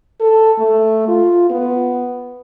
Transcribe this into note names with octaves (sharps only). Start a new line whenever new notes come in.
A4
A3
F4
B3